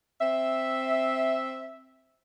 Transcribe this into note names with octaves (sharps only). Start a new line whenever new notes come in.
C4 E5